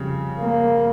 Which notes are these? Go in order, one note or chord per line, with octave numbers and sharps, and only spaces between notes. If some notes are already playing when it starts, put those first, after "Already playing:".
Already playing: F2 C#3 G3
A#3